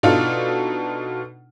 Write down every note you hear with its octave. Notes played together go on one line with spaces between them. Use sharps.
B2 D4 D#4 F4 A4